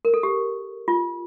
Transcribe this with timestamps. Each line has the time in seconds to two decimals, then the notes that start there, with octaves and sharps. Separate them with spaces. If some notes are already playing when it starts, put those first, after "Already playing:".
0.05 A#4
0.14 A4
0.23 G4
0.88 F4